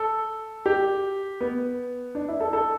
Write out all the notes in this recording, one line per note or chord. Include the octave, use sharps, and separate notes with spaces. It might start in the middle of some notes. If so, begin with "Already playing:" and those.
Already playing: A4
G4
B3
D4
E4
A4
A4